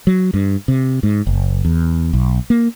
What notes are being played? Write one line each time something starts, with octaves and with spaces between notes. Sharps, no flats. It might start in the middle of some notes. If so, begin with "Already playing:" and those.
F#3
G2
C3
G#2
F#1
E2
B1
A#3